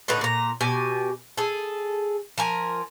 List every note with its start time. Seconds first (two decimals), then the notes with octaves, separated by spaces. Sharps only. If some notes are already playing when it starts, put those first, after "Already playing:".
0.08 A2 D3 D#4 B4
0.21 A#2 A#5
0.61 B2 G4 G#5
1.37 G#4 A4
2.38 F3 A#4 G#5